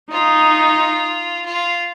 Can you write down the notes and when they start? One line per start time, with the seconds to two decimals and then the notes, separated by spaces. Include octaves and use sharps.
0.11 D#4 F4
1.45 F4